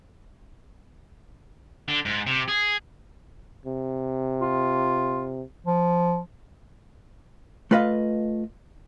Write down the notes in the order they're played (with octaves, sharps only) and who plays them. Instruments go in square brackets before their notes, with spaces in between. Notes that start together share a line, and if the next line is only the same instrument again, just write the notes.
[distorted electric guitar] D3
G#2
C3
G#4
[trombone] C3
[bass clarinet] F4
F3
[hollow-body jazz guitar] A3 F4 B4 D#5 F5